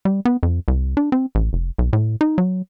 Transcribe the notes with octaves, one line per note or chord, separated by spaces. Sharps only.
G3
B3
F2
C2
D4
C4
A1
F1
B1
A2
D#4
F#3